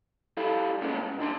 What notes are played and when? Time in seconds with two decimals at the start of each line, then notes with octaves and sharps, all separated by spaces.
0.37 G3 E4 A4 F5
0.81 C3 G#3 A#3 B3 C#4
1.01 G#2
1.19 D#2 D4 B5 C6